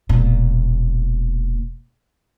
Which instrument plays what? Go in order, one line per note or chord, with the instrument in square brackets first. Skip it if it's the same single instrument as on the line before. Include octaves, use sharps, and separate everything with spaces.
[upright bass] E1 A#2